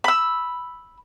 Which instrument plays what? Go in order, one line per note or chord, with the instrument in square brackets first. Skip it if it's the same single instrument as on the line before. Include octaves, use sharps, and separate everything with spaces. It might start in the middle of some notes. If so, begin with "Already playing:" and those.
[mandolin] B5 E6